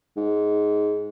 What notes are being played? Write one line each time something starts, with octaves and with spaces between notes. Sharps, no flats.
G#2